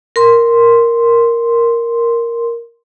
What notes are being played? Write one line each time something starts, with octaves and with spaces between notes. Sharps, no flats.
A#4 C6